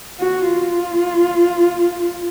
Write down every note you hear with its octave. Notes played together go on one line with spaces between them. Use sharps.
F#4
F4